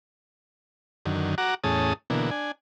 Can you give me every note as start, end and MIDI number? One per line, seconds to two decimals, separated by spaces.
1.06 1.35 42
1.06 1.35 50
1.06 1.35 51
1.38 1.55 66
1.38 1.55 78
1.38 1.55 82
1.38 1.55 86
1.64 1.93 40
1.64 1.93 45
1.64 1.93 61
1.64 1.93 68
1.64 1.93 81
1.64 1.93 87
2.10 2.30 47
2.10 2.30 50
2.10 2.30 52
2.10 2.30 58
2.31 2.52 62
2.31 2.52 80